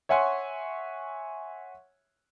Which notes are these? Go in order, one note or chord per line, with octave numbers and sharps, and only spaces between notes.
C#5 E5 F#5 G#5 C6 C#6